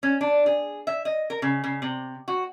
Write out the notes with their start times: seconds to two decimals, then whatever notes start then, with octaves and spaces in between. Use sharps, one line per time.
0.03 C#4
0.21 D4
0.46 G#4
0.87 E5
1.05 D#5
1.30 A#4
1.42 C#3
1.64 C#3
1.82 C3
2.28 F#4